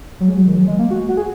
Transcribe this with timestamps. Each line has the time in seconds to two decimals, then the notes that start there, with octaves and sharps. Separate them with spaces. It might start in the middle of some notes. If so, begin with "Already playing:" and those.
0.20 F#3
0.28 G#3
0.38 F#3
0.47 D#3
0.55 F#3
0.67 G#3
0.79 A#3
0.91 F#4
1.08 F#4
1.17 G#4